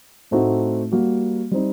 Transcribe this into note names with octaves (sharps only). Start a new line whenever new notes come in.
A2 A3 C4 D#4 F#4
G3 A#3 F#4
G3 C4 D#4